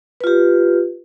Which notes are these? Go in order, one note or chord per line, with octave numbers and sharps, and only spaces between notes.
F4 G4 B4